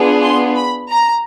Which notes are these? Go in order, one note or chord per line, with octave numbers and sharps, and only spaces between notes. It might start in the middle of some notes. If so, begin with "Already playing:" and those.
Already playing: B3 D4 F4 G#4
C6
B5
A#5